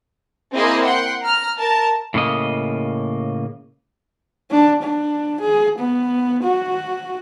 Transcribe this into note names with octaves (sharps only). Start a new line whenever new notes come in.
A#3 C4 E4 G#4 D#5 C6
F#5 G5 C6
A#5 F6
A#4 A5
A2 C#3 A#3 D#5
D4
D4
G#4
B3
F#4